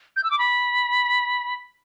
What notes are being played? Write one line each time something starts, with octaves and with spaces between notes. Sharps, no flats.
G6
E6
D6
B5